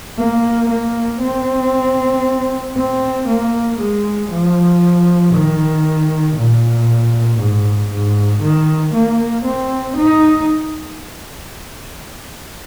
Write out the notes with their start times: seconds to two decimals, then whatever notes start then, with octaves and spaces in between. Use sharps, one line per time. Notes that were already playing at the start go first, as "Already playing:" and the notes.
0.18 A#3
0.69 A#3
1.22 C4
2.76 C4
3.28 A#3
3.79 G#3
4.31 F3
5.33 D#3
6.37 A#2
7.39 G#2
7.91 G#2
8.42 D#3
8.94 A#3
9.45 C4
9.97 D#4